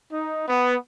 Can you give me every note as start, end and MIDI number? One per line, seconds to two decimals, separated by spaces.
0.12 0.45 63
0.48 0.75 59